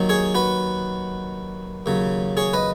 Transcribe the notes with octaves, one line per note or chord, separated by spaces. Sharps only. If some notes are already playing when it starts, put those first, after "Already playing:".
Already playing: D#2 D#3 F#3
G#4 C#5
F#4 B4
D#2 C#3 F#3
G#4 C#5
B4 D#5